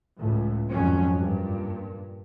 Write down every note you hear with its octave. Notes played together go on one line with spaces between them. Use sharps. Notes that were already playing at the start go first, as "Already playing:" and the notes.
C#2 A2
G#1 F2 F#3 C#4
G2 A#2